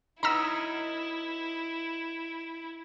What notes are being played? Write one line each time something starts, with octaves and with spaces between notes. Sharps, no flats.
F#3 B3 D#4 E4 A#5 B5 E6